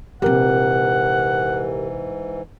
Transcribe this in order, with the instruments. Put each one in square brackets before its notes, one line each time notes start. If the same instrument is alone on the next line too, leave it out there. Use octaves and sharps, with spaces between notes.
[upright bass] A#1 C3 [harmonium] G#2 E3 [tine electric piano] G4 A#4 [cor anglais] F#5